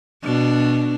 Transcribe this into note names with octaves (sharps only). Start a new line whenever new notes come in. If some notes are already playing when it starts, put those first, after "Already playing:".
B2 D4